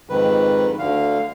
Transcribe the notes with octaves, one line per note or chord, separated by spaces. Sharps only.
F2 G#2 D#3 B4
D2 D3 F5